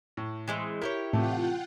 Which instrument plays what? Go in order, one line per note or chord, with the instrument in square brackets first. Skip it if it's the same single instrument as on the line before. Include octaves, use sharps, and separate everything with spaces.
[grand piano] A2
[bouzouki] E3 G#3 C4
[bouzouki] E4 G4 C#5 [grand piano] A#4
[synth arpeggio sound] A2 [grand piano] C3 E3 A3 [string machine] F4 F#5 G5